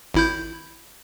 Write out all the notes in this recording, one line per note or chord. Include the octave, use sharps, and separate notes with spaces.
G#1 E4 G6